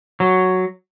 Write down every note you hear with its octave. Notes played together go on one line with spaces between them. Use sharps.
F#3